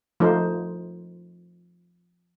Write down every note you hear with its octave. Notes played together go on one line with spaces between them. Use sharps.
F3 A3 D#4 C5